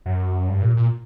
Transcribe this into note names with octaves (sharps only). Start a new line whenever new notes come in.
F#2
G2
A#2
A#2